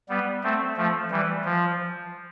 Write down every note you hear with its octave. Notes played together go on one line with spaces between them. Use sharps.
G3 B3
A3 C4
F3 A3
E3 G3
F3